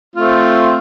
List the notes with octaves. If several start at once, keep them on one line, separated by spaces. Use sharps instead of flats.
A3 C4 F4